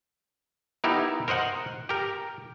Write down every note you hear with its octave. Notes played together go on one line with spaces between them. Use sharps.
B3 D#4 E4 G4 A#4
A#4 C5 D#5 F#5
G4 A#4